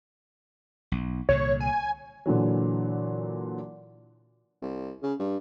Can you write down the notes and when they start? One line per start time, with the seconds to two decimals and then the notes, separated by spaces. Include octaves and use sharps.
0.92 B1
1.29 C2 A#2 D3 C#5
1.60 G#5
2.26 A#2 D3 E3 F#3
4.62 C2
5.03 C#3
5.19 G2